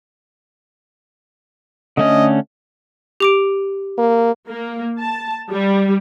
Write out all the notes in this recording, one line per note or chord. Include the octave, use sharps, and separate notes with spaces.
D3 A3 C#4 D#5
G4 D6 D7
A#3
A#3
A5
G3